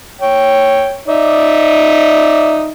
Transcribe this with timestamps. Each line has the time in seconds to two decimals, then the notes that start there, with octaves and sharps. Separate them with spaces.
0.21 C#5 G5
1.07 D#4 D5 E5